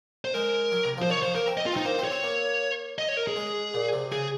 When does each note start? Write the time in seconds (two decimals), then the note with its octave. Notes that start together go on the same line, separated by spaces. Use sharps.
0.25 C5
0.34 G#3 A#4
0.72 F#3
0.85 C3
0.97 F3
1.02 C5
1.09 D#3 C#5
1.22 F3 C5
1.35 A#3 A#4
1.47 C4
1.57 D#5
1.66 F4
1.73 C4 D#4
1.85 A#3 C5
1.98 C4
2.05 C#5
2.10 C4
2.23 A#3
2.98 D#5
3.08 C#5
3.17 A#4
3.27 G#4
3.36 G#3
3.74 A#2
3.93 C3
4.11 C#3 G#4